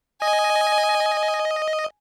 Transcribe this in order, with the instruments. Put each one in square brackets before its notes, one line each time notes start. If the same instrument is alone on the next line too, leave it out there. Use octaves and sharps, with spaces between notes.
[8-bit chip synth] D#5 [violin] G#5